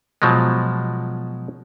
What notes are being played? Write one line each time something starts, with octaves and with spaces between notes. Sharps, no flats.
B2 F3 F#3 G#3